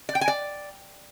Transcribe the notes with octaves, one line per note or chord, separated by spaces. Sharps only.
D5
G5
G#5
D5